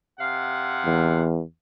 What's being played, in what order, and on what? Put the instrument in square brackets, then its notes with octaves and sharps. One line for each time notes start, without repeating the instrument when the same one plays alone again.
[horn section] C3 F5 F#5
[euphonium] E2